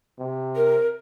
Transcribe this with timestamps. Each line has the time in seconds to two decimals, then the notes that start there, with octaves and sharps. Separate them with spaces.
0.19 C3
0.56 A#4